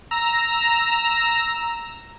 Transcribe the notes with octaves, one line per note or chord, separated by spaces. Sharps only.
A#5 E6